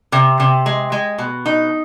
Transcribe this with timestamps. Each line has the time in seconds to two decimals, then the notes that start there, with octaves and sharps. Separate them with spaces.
0.12 C3
0.40 C3
0.66 G#3
0.92 G#3
1.18 B2
1.46 D#4